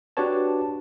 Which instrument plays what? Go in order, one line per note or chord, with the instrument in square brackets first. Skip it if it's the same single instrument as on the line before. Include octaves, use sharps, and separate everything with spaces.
[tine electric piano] D4 F#4 G4 B4 C#5 A5